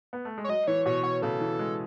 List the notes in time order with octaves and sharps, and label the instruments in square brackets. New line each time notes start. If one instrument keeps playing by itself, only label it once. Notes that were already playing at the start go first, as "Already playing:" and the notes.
[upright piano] B3
A3
G#3
[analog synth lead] C#5
[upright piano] F#3 [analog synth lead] D#5
[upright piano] E3 [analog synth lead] C#5
[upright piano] B2 [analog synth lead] C#5
[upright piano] B2 [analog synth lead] C#5
[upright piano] C#3 [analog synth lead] A4
[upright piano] E3
G#3